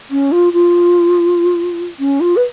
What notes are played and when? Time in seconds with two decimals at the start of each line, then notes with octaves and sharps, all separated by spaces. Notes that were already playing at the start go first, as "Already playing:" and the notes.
0.11 C#4
0.32 F4
0.53 F4
1.99 C#4
2.21 F4
2.36 B4